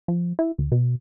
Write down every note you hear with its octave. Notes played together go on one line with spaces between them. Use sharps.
F3
E4
D2
B2